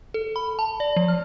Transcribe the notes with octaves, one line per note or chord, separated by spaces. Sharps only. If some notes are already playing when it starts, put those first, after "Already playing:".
A4
B5
A5
D5
F3
F6